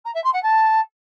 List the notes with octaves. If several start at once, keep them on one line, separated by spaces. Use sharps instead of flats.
A#5
E5
C6
F#5
A5